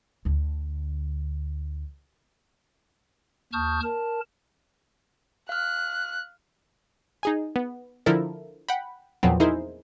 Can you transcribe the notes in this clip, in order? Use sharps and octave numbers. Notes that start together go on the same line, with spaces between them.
D2 D3
D#2 A5 C#6 D#6 F6 G6
A#4 A5
F5 F6 F#6
D#4 G#4 G#5
B3
D3 F3 E4 A4 A#4
F#5 G5 B5
E2 A#2 F3 F#3 B3 C4
D#4 E4 G#4 A#4 C5